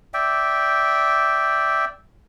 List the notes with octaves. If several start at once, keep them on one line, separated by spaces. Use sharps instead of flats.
D5 E5 G5